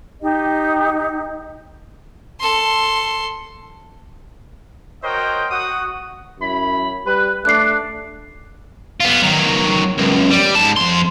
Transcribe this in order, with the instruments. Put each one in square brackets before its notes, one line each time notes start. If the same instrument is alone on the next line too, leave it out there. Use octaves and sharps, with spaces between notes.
[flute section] D#4 G4 D#5
[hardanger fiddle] A4 C6
[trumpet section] F#4 A#4 C5 C#5 D#5 G5
F#4 F#5 D#6
[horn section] F#2 E4 B5
G3 B4
[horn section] A3 D4 [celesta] F#6 C7
[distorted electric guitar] B3 F4
D#3 F#3
C#2 F#2
G3
G#2 A5
F2 C6